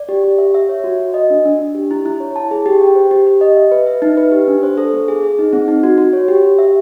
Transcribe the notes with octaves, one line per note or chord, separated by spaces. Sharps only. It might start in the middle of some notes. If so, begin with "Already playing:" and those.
Already playing: D5
G4
G4
E5
E5
C#5
F#4
F#4
D#5
D4
D4
D4
G4
E4
E4
C#5
A5
G#4
G4
G5
C5
G4
G4
D#5
E5
B4
E5
D#4
B4
G4
D4
C5
A4
B3
G#4
G#4
D#4
C4
D#4
F#4
F#4
C#5
G4
G4
E5